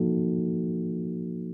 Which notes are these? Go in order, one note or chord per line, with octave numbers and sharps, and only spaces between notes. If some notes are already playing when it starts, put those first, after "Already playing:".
Already playing: F3 A#3 D#4 F#4 A4